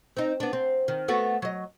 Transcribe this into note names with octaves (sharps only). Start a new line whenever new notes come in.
C4 D#4
B3 D4
C4
D#3
A3 B3 F#4
F#3 D#5